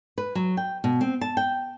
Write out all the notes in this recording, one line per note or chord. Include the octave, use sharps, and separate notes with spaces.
B4
F#3
G5
B2
C4
A5
G5